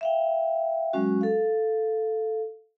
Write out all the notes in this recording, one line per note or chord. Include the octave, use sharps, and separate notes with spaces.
E5 F5 G5
F#3 G#3 C#4 F#4
A4 F5